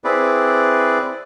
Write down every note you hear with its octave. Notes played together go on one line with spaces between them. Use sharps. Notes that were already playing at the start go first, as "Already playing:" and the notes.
C4 E4 G#4 B4 D5